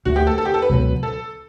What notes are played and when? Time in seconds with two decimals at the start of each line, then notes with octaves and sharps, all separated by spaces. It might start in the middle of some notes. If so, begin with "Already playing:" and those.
0.05 D2 D3 A3 F#4
0.16 G4
0.27 A4
0.38 A4
0.45 G4
0.54 A4
0.62 B4
0.70 C#2 B2 F#3
1.03 A4